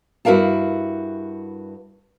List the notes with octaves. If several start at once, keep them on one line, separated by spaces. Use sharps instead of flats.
G2 E4 F#4 A#4 F5 A5